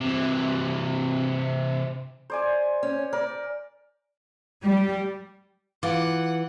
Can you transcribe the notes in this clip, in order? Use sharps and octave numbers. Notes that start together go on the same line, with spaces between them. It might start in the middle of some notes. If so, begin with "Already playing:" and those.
C3 E3
C5 D5 G#5
C#4
A#4 D5
G3
E3 F4 F#5 D6